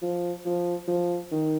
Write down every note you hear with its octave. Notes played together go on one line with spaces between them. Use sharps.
F3
F3
F3
D#3